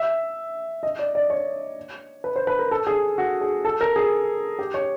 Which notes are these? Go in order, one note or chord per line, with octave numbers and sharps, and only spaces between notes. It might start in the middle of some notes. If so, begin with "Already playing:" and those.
Already playing: E5
D#5
D5
D5
C#5
B4
C5
B4
A#4
A4
G#4
F#4
G#4
A4
A#4
G#4
G4
C#5